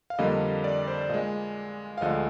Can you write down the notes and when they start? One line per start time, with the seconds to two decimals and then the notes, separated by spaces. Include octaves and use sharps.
0.10 F5
0.19 F2 D3 G3 A#3 D#5
0.64 D5
0.88 C5
1.09 A#2 G#3 D#5
1.98 F5
2.01 D2 D3 F3 G#3 D#5